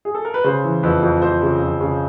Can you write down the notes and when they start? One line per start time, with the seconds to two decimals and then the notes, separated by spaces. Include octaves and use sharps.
0.05 G#4
0.15 A4
0.25 A#4
0.34 B4
0.44 C#3 C5
0.64 E3
0.83 F2 B4
1.03 F2
1.22 F2 C5
1.42 C#3
1.61 F2
1.81 C#3